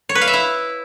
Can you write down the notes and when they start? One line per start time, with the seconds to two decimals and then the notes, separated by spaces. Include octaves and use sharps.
0.09 C#5
0.15 B4
0.21 F5
0.27 E5
0.33 E4